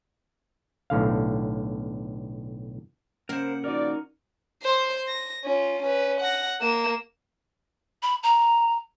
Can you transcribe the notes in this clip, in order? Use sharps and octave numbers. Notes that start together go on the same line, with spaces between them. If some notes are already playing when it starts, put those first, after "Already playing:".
B1 A2 D3 F5
C#3 A#3 A#4 C5 F#5
F3 D#4 F#4 A#4 D5
C5 C6
A#6
C#4 F4
C#4 B4
F#5 A#6
A#3 E7
B5
A#5